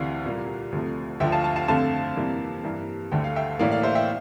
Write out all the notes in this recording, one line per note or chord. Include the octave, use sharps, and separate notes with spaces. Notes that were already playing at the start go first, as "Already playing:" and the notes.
Already playing: D2 C3 E3 D5 F5
C2 A#2 G3 A#3
D2 C3 F3 A3
D2 D3 F3 E5 G5
F5 A5
F5 A5
F5 A5
F2 D3 A3 F5 A5
F2 C3 E3 G3 A#3
G2 E3 G3 A#3
D2 D3 A3 G5
F5
E5 G5
A2 E3 A#3 D5 F5
D5 F5
C5 E5
E5 G5